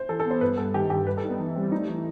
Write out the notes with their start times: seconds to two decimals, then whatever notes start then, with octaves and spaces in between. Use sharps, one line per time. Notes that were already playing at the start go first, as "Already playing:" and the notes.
Already playing: C5
0.09 E3 A4
0.20 A4
0.25 B3
0.30 C5
0.41 G2 B4
0.57 G2 A4
0.74 D#3 G4
0.90 G2 G4
1.07 G3 B4
1.17 A4
1.23 D#4
1.28 B3
1.39 E3
1.56 G3 C4
1.72 A3 D#4
1.88 E3